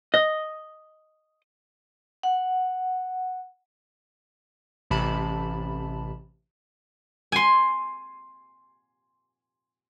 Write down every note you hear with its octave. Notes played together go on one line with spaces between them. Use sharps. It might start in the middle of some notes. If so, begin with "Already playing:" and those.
D#5
F#5
A1 C3 A5 B5
G#5 C6